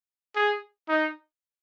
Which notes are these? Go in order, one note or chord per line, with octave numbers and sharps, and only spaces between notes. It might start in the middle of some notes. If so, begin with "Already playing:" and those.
G#4
D#4